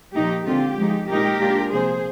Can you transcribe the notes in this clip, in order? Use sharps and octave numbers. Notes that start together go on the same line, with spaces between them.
A#2 F3 A#3 D#4 G4
D3 G#3 C4 F4 G4
F3 G#3 D#4
A#2 G#3 D#4 G4 A#4
A#2 G#3 D4 F4
C3 F3 A#3 G#4 C5